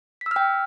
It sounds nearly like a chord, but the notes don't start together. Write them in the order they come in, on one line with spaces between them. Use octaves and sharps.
B6 E6 F6 G5